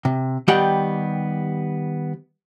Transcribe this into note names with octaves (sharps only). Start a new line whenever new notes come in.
C3
D#3 G3 B3 G4 F#5 G5